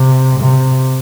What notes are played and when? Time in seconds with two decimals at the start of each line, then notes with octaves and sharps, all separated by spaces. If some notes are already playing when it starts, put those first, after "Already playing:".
Already playing: C3
0.40 C3